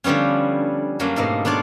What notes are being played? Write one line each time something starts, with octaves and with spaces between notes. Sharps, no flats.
D3 F3 G3 B3 C#4
F#2 F#3 G3 A#3 D4
G#2 B2 G3 A3 A#3
B3 D4 F4 C#5 D5